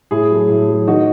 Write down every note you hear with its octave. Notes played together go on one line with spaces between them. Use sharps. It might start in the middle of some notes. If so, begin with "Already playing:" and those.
A2 E4 G#4
F#3 A3
A2
F#3 A3
D#3 D#4 F#4